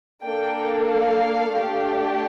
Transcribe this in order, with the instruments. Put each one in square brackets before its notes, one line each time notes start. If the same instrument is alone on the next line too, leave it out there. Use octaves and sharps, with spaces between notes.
[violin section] A#3 D4 A4 G5
F5
A3 D4 G4